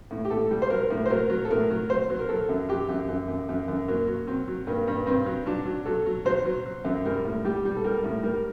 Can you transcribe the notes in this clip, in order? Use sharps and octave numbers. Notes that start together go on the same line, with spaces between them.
A2
G4
A2 A4
G3
C5
F#3 A#4
A2
C5
F#3 A#4
F#3
A4
A2 A#4
F#3
F#3 C5
F#3
A#4
F#3 A4
F#2
F#3 G4
F#2
F#2
F#2
F#2
F#2
F#3 A#3
F#3
F#3 C4
F#3
G2 A#3
G2
G2 C4
F#3
F#3 D4
F#3
F#3 A4
F#3
F#3 C5
F#3
F#3
F#2
G3 A#4
A2
G3 G4
G3
A4
G3 A#4
A2
G3 A#4